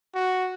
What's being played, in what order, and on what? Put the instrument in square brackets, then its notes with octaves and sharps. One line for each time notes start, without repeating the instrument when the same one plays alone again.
[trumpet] F#4